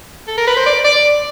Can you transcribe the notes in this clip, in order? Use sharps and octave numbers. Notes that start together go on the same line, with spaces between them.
A4
A#4
B4
C5
D5
D5